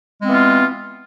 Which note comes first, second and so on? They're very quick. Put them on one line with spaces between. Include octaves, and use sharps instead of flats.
G#3 C4 B3 E3 F4